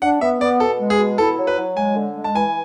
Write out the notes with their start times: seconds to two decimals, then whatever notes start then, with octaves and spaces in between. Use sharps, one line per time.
0.02 D4 F#5
0.21 B3 E5
0.41 B3 D5
0.60 B2 A4
0.80 G#3
0.90 G#4
0.99 B2
1.18 E4 A4
1.38 F#3
1.47 B4
1.57 F#3
1.77 G#3 G#5
1.96 D3
2.16 G#3
2.24 A5
2.35 E3 G#5